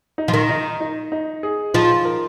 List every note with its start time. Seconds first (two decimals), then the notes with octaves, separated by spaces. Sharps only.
0.18 D#4
0.28 F3
0.33 D#3
0.49 D#4
0.80 D#4
1.12 D#4
1.43 G#4
1.74 F3 D#4
2.05 A#4